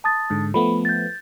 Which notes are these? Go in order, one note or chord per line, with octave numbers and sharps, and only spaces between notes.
A5 D#6 A6
G#2 D3
F3 A3 B3 B5
G6 A6